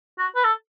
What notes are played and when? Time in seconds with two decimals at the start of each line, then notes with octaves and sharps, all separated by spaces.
0.18 F#4
0.36 B4
0.44 A4